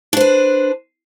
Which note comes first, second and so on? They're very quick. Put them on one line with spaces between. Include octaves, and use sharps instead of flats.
D4 C5 B4